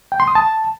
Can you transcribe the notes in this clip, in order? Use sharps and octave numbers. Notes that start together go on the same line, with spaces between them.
G5
C6
D#6
A5